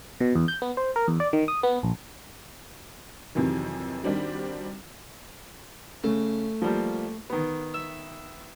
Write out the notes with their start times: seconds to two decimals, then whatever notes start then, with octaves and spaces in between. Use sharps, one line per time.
0.20 B2
0.35 E2
0.48 G6
0.62 B3
0.77 C5
0.96 A#4
1.08 E2
1.20 D5
1.33 D#3
1.48 D#6
1.63 B3
1.83 A#1
3.35 F2 C3 D#3 E3 F#3
4.03 D#3 G3 C4 D4 F#4
6.04 C#3 A3
6.62 F3 G3 A#3
7.30 D#3 B3
7.74 E5